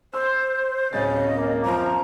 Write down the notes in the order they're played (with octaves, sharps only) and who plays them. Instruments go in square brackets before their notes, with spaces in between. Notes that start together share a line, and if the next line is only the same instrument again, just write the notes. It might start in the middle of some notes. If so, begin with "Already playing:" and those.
[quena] C5 [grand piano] C6 E6
[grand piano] D1 C#4 A6 [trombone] C#3 [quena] D#5
[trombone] A#3
[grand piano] F#2 [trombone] F3 [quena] A#5